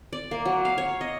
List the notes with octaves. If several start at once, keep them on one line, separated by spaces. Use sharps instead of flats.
D5
A#3
F#3
F5
C#5
D#5